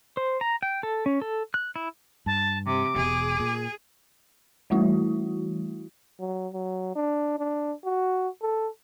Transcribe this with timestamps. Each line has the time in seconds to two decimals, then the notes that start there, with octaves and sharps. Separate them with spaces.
0.17 C5
0.41 A#5
0.63 G5
0.83 A4
1.06 C#4
1.22 A4
1.54 F#6
1.76 E4
2.26 G2 A5
2.66 C3 D6
2.96 E1 B2 G#4
3.40 A#2
4.70 E3 G3 A3 E4 F#4
6.20 F#3
6.53 F#3
6.96 D4
7.39 D4
7.84 F#4
8.42 A4